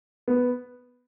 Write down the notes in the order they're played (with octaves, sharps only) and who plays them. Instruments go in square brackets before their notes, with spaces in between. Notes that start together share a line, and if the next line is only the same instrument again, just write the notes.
[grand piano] B3